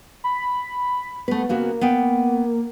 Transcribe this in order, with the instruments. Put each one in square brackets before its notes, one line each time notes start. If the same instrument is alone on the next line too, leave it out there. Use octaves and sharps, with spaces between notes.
[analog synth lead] B5
[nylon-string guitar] A3 B4 [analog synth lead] B3
[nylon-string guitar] C#3 B3 F#4 [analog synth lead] A#3
[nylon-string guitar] B3 F5 G5